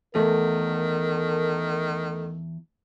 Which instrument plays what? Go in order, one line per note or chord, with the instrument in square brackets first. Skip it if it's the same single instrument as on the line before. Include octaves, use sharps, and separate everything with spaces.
[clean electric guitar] E2 [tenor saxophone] D#3 [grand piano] A3 [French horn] A#4